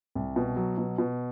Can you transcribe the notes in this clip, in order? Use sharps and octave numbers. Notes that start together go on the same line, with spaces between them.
C2
B2
F#3
B2
B2